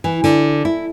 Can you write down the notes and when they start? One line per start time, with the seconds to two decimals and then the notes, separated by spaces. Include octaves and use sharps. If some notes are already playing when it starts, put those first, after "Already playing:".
0.04 E3
0.24 D3
0.65 E4